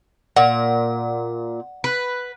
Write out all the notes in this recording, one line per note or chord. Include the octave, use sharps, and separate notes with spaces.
A#2 F#5
B4